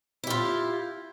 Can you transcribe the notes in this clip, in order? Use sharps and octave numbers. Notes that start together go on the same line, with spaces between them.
E4 F4 G4